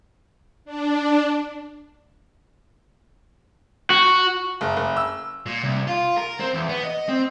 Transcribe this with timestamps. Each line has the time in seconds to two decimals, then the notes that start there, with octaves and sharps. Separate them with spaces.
0.65 D4
3.90 F#4
4.61 F#1
4.77 F#1
4.97 E6
5.46 A#2
5.64 C2
5.87 F4
6.17 A#4
6.39 C4
6.54 E2
6.69 B3
6.83 D#5
7.09 C4